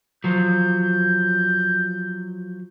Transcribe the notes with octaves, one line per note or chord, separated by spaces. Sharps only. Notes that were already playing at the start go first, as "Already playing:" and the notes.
F3 F#3 G6